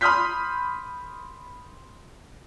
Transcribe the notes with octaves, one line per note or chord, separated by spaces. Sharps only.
B5 C6 D#6 F6 G6 B6